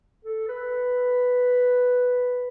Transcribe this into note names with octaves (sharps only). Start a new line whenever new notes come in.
A4
B4